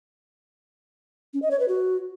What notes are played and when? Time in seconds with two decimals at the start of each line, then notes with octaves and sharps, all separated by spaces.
1.34 C#4
1.42 D#5
1.51 C#5
1.60 B4
1.68 F#4